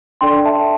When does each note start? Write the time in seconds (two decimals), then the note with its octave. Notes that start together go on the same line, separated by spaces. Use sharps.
0.21 D4 A4 D5 G5 C6
0.45 E5 A5